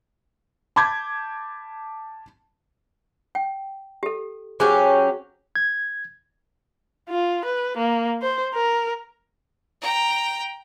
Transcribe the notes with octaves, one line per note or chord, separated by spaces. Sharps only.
A5 B5 D6 G6 G#6
G5
G4 A4
F#3 C#4 G4 G#4 C5
G#6
F4
B4
A#3
C5
A#4
G5 A#5